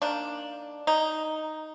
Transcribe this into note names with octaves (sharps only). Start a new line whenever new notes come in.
D#3 A#3 D4
D#4